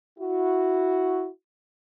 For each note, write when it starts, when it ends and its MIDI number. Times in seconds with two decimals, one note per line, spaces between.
0.19 1.28 64
0.19 1.28 66